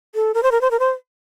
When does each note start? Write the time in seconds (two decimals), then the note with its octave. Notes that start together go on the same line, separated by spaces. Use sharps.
0.15 A4
0.34 A#4
0.43 C5
0.52 A#4
0.61 C5
0.71 A#4
0.79 C5